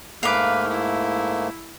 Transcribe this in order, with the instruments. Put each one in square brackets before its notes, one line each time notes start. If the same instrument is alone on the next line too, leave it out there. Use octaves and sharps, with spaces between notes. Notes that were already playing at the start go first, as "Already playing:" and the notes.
[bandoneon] G#2 A3 A#3 [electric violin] B4 F6 [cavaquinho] F5 D6
[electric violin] E4